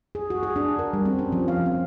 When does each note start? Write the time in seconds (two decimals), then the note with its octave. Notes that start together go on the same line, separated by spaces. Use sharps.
0.15 G#4
0.30 F#4
0.43 G#4
0.56 D4
0.79 A#4
0.93 G3
1.05 C4
1.19 C#4
1.32 F3
1.48 F5
1.66 C4